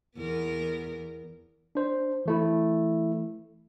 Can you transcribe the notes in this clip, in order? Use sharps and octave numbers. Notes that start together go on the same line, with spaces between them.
E2 B3 A#4
D4 C5
E3 A3 E4